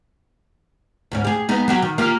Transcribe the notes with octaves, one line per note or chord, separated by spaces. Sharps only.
D2 G#2 C#4
G4 G#4
G#3 B3 D#4
F#3 F#4 G4
D#3
A#3 F4 G4